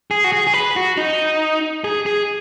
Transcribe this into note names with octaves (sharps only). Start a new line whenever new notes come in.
G#4
F#4
G#4
G#4
B4
F#4
D#4
G#4
G#4